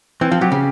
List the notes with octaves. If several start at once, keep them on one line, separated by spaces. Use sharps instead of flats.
E3 C4
F3
F#3 G4
C#3